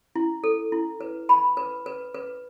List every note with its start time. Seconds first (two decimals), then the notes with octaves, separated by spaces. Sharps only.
0.16 E4
0.44 A4
0.72 E4
1.01 B4
1.29 B5
1.57 B4
1.86 B4
2.14 B4